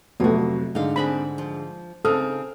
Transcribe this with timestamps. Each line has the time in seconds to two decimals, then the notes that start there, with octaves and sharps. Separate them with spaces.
0.20 F2 C3 F#3 A3 B3 F4 F#4
0.75 G#2 D3 D#4 F5
0.96 C4 D4 G#4 B5
1.38 F3
2.05 C#3 C4 D#4 A4 D#6 F6